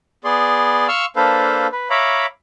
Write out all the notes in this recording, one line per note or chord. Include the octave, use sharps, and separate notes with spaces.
B3 G#4 D5 C6
F5 C6 C#6 E6 F6
A#3 D4 A4 B4 C5 F5
B4
C#5 E5 F5 A#5 B5 D6